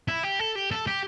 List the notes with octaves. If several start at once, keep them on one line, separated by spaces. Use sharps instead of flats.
E4
G4
A4
G4
A4
G4